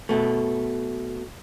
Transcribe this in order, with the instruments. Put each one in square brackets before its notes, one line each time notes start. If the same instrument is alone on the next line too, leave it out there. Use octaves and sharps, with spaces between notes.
[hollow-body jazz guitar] B2 A3